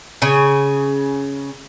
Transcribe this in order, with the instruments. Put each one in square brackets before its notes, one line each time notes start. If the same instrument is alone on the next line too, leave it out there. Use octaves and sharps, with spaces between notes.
[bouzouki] C#3 G#5